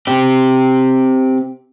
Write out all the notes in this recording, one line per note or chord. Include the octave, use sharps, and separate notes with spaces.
C4 G4